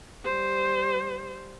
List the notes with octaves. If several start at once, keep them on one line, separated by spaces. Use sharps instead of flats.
G3 C5